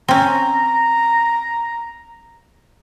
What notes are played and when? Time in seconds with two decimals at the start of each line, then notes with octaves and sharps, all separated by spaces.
0.08 C4 C#4 A#5